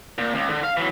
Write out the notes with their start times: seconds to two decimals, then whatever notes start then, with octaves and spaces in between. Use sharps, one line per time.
0.18 A#2
0.35 C#2
0.50 D3
0.64 F5
0.77 E3 F#3